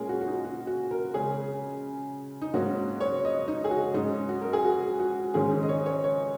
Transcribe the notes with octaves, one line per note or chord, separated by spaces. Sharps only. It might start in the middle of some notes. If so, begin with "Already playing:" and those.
Already playing: A#2 G#3 C#4 G#4 A#4
F#4
F#4
D#4
F#4
F#4
A#4
C#3 G#3 C#4 G#4
D#4
G#2 F#3 A#3 C#4 F#4
C#5
D#5
D#4
G#4
F#4
G#2 F#3 C#4 D#4
F#4
A#4
G#4
F#4
F#4
G#2 D#3 G#3 C#4 G#4
D#4
D#5
C#5
C#5
C#5